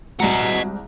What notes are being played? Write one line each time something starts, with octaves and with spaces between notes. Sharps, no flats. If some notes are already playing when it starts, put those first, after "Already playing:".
C2 G#2 F#4 D#5 F#5 A#5